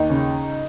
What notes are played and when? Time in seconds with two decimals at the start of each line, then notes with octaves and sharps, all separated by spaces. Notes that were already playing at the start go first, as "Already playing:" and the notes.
Already playing: D#2 D#4
0.10 C#3